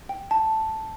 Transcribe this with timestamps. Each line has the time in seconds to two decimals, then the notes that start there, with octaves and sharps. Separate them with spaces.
0.09 G5
0.31 A5